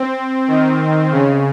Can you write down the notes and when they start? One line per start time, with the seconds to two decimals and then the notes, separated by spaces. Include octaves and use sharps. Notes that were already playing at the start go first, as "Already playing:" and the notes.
Already playing: C4
0.48 D#3
1.12 C#3